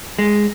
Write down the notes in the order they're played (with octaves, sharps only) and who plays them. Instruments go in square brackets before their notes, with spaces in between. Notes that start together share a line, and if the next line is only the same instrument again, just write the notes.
[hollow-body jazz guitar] G#3